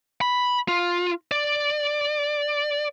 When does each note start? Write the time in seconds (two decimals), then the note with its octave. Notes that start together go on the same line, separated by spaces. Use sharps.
0.21 B5
0.68 F4
1.31 D5